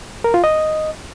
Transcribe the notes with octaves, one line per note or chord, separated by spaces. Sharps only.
A#4
F4
D#5